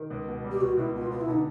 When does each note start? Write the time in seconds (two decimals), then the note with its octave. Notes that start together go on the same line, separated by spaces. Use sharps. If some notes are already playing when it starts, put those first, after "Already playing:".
Already playing: D#3
0.10 C#2
0.27 B2
0.44 G3
0.52 G4
0.61 C#2 F#4
0.77 C#2 E4
0.95 B2 F4
1.11 B3 F4
1.21 E4
1.27 D3 D#4